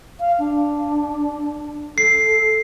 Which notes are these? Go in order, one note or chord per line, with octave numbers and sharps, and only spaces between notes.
F5
D4
A4 C7